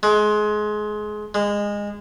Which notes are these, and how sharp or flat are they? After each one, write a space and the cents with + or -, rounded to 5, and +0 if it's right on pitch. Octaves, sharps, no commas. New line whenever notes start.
G#3 +25
G#3 -20